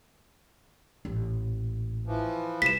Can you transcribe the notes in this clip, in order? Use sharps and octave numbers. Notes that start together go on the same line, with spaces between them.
A1 A#2
E3 F3
C2 G3 B6 E7